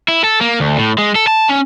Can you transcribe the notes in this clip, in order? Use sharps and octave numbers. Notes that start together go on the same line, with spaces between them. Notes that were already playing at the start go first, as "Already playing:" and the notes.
E4
A4
A#3
D2
A2
G#3
A4
A5
C#4